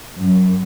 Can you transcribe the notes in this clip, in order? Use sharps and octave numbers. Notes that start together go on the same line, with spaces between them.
F#2